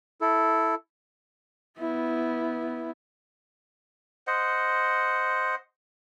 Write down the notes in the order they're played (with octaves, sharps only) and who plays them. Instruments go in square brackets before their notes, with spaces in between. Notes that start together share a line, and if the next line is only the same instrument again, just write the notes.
[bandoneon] E4 A4
[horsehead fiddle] B3 E4
[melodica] C5 D#5 F#5